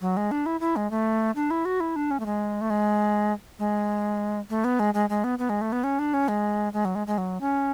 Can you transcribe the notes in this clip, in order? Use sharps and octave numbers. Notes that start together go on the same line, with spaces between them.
F#3
G#3
D4
E4
E4
G#3
A3
D4
E4
F#4
E4
D4
C#4
A3
G#3
A3
G#3
G#3
A3
B3
G#3
G#3
G#3
B3
B3
G#3
A3
B3
C#4
D4
C#4
G#3
G#3
F#3
G#3
G#3
F#3
C#4